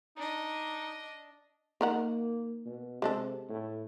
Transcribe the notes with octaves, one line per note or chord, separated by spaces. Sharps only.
D4 D#4 D#5
D#3 A#3 A#4 F#5
B2
C3 G#3 D4 A4
A2